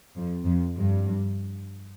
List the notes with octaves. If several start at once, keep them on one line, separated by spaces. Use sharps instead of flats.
F2
F2
G2